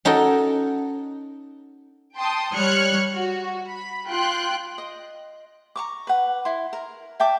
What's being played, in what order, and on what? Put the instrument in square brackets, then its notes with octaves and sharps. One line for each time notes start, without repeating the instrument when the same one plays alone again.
[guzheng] C#4 D#4 F#4 A4 A#4
[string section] G5 A5 C6 D#6
G3 C#5 F6 F#6 G#6 C#7
F#4
B5
F4 G5 C6 F#6
[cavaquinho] D#5
A#5 C#6 D6
B4 F#5
E4 C6
A#4
E5 G5 A5 D6